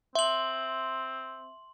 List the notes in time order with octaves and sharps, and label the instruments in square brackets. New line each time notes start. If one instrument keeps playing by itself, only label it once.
[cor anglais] C4 [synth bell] E5 [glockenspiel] C6 F#7